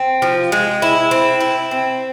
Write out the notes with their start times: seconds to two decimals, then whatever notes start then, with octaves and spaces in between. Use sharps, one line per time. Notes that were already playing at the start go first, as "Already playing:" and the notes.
Already playing: C4
0.22 F3
0.52 G#3
0.82 E4
1.11 C4
1.40 E4
1.71 C4